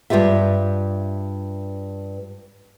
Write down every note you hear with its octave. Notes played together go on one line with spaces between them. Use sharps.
G2 C3 F4 G4 E5